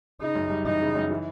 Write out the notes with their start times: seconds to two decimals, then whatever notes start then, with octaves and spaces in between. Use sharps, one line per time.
0.21 C#3 D#4
0.35 F#2
0.50 G3
0.65 E3 D#4
0.81 C#3
0.95 F#2
1.11 E3